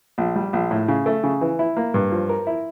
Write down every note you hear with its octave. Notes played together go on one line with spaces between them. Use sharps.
A#1
G3
A#1
A2
C#3
A3
C#3
E3
E4
A#3
G2
F3
A#4
E4